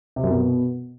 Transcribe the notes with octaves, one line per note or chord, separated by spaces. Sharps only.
C3
F#2
B2